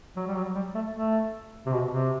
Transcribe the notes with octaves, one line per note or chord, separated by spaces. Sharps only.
F#3
G3
F#3
G3
A3
A3
C3
B2
C3